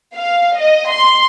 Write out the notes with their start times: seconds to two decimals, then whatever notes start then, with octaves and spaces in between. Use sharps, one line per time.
0.15 F5
0.60 D#5
0.91 C6